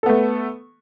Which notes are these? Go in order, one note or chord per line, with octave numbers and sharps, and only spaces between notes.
A3 B3 A4